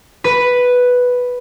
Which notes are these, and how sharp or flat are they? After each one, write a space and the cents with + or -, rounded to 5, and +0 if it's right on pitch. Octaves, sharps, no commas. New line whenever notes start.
B4 +0